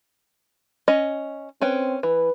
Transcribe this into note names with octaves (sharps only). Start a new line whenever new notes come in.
C#4 D#5
C4 C#4 B4 G5
E3 B4